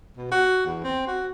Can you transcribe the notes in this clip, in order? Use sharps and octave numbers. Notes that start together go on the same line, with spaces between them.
B2
F#4
E2
C4
F#4